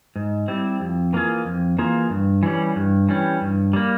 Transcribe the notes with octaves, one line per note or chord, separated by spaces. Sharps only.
G#2
G3 C4 E4
F2
E3 A#3 F4 G#4
F2
E3 A#3 F4 G#4
G2
E3 G3 C#4
G2
E3 G3 C#4
G2
G3 A#3